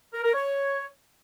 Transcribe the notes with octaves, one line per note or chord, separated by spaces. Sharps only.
A#4
A#4
C#5